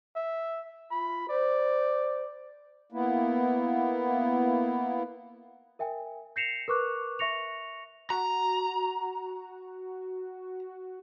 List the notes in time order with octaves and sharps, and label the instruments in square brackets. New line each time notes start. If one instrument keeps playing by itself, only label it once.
[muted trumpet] E5
[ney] F4 [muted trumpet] B5
[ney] C5 [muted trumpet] D5
[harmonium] A#3 B3 E4
[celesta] A#4 E5 G5 G#5
G6 A#6 C7 C#7 E7 F7
A#4 B4 C#6 D6 F#6
E5 C#6 A#6 C#7 F7
[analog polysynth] F#4 [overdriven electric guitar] A#5